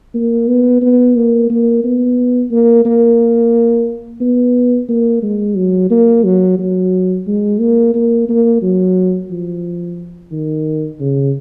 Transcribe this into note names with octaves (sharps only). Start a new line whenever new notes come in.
A#3
B3
B3
A#3
A#3
B3
A#3
A#3
B3
A#3
G#3
F#3
A#3
F#3
F#3
G#3
A#3
A#3
A#3
F#3
F3
D#3
C#3